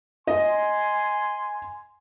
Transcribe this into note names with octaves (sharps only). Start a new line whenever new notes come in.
D#5 G#5 C6